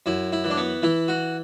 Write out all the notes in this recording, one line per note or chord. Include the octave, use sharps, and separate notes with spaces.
F#2 E4
E4
E3
D4
B3
E3 E4
F#4